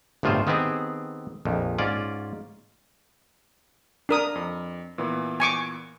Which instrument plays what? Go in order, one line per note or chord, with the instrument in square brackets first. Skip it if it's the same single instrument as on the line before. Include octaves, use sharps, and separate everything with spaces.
[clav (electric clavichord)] G1 A2 C3 F4 G#4 C5
D#3 B3 C4 G4 G#4 D#5
A#1 F2
G#2 C#4 F4 D5
[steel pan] D4 A#4 D#6
[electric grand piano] F2
A#2 E3 B3
[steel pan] G#5 C#6 D6